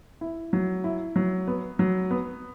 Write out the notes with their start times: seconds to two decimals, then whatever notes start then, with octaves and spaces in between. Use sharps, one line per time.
0.21 E4
0.53 F#3
0.84 E4
1.16 F#3
1.48 B3
1.79 F#3
2.11 B3